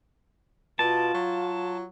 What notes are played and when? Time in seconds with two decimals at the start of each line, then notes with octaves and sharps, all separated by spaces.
0.79 B2 F4 A5
1.14 F#3